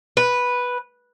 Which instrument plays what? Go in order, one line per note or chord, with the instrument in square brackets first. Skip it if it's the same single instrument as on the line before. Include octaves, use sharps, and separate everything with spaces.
[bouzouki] B4